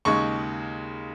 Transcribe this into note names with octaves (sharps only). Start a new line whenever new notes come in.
D#2 C#3 G#3 D#4 C#6